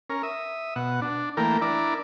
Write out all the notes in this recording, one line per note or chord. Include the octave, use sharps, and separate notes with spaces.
C#4 A#4
E5 D#6
B2 F#5
D4
E3 A3 A#3 A#4 G5
D4 E4 A#4 D5